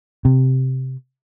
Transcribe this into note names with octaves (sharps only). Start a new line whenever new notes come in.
C3